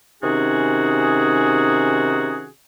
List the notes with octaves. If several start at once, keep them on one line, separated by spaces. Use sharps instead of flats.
C3 D#3 C#4 D#4 F#4 G#4